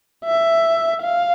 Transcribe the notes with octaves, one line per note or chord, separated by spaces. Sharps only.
E5
F5